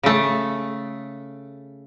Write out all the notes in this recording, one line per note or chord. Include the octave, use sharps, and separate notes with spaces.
C#3 A3